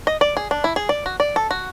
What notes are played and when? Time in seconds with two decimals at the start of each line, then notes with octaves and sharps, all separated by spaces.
0.07 D#5
0.21 D5
0.37 G#4
0.51 D4
0.64 E4
0.76 G#4
0.89 D5
1.06 F#4
1.20 D5
1.36 A4
1.51 F#4